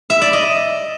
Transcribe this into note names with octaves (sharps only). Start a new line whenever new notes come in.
E5
D5
D#5